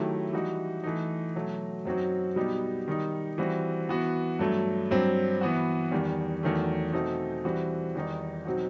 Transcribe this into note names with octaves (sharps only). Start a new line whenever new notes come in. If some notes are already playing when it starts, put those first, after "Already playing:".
Already playing: D#3 F#3 A3 E4 G4
E3 G3 D#4 F#4
E3 A3 D#4
B2 F#3 A3
F#2 F#3 C4 D#4 F#4
B2 G3 B3 D#4 G4
D#3 G3 D#4
E3 G3 C4 F#4
E3 B3 F#4
G2 F#3 A3
G2 F#3 C4
E3 B3 F#4
E2 D#3 G3
E2 D#3 F#3 A3
B2 A3 C4 D#4
E3 G3 C4 F#4
E2 D#3 G3 D#4
B2 F#3 C4 D#4 F#4